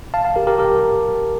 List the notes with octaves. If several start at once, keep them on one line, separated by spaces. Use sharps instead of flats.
F5 A5
F5 A5
G4 A#4
G4 A#4
G4 A#4